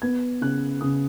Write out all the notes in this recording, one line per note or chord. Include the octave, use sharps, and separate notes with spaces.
B3 G#6
C#3 F#6
C#3 D#6